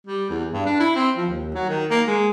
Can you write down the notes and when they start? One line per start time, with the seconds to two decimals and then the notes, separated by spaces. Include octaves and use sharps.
0.07 G3
0.30 E2
0.52 G2
0.66 D4
0.80 E4
0.96 C4
1.17 F3
1.29 D#2
1.55 F#3
1.69 D#3
1.91 A#3
2.07 G#3